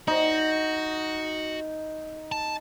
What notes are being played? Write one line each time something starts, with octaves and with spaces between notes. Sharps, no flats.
D#4 F#4
A5